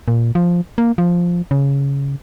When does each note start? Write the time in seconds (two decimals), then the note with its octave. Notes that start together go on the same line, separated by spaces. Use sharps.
0.08 A#2
0.35 F3
0.78 A#3
0.98 F3
1.51 C#3